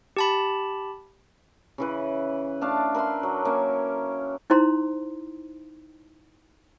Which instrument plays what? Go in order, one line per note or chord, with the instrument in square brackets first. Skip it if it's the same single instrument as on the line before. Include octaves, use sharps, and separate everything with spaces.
[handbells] G4 A5 B5
[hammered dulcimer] C#3 E3 B4
A3 D4 F5 A5
A#4 B4 E5 C6
F#3
A#3 C#4 C#5 E5
[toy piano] D#4 E4 C5 A#5 C6